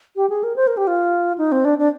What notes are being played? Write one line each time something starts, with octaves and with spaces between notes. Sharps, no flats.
G4
G#4
A#4
C5
A#4
G4
F4
D#4
C4
D4
D4